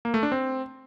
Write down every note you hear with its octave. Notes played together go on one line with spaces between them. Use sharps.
A#3
A3
D4
C4